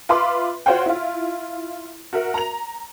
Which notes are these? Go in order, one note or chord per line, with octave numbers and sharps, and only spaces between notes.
F4 B4 E5 B5 C6 D6
F4 F#4 C5 C#5 F#5 G5
E4 F4
F#4 A#4 E5
A#5 F7